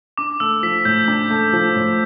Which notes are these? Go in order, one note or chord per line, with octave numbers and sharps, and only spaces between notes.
D4 D6
A3 E6
F3 B6
A2 G6
D4
A3
F3
A2